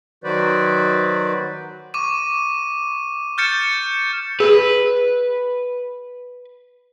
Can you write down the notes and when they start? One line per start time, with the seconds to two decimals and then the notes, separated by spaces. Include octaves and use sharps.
0.24 D#3 F#3 F#4 B4 C5 D5
1.94 C#6 D6 D#7
3.38 F6 G6 A6 C#7 E7
4.40 G#4 B4